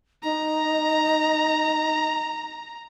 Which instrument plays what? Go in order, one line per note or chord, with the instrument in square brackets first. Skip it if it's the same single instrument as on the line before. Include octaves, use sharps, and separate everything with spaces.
[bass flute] D#4 [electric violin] A#5